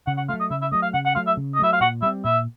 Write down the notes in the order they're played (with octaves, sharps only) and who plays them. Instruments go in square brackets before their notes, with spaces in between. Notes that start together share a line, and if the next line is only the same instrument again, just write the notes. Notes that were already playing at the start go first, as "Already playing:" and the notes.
[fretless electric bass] C#3 [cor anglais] F#5
[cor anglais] F#5
[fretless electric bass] F#3 A3 [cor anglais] F5
[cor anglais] D#5
[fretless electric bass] C#3 [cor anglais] E5
[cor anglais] E5
[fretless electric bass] F#3 A3 [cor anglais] D#5
[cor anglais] F5
[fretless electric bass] C#3 [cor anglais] F#5
[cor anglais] F#5
[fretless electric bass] F#3 A3 [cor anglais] F5
[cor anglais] E5
[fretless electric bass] C#3
[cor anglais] D#5
[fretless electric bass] F#3 A3 [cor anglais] E5
[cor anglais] F5
[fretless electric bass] A#2 [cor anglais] F#5
[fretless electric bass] G3 C4 [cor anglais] E5
[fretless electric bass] A#2 [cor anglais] E5